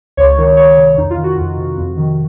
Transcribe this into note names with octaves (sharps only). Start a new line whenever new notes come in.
C#2 C#5
D#3
C#2 C#5
C3
F2 D#4
F4
D#3
F#4
F2
C3
F2
D#3